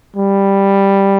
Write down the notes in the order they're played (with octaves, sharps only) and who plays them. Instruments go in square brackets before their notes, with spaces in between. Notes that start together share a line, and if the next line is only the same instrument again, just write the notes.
[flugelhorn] G3